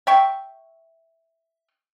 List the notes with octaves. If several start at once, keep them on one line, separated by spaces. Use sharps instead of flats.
E5 G5 C#6